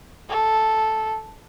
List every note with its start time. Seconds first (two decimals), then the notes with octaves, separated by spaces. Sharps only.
0.30 A4